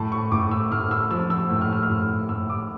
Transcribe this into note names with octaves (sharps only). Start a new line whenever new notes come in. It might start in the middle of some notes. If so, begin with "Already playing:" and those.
Already playing: A2 A5
C#6
A2 D6
E6
A2 F6
E6
F3 E6
E6
A2
F6
E6
F6
A2
A2 E6
D6